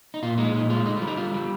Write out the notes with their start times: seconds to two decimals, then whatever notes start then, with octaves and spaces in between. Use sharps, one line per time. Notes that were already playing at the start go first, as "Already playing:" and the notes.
0.14 D#4
0.22 A#2 F4
0.38 G#3 D#4
0.53 A#2 D#4
0.70 G#3 F4
0.85 D3 D#4
0.96 F4
1.02 G3
1.07 D#4
1.17 D3 F4
1.34 G3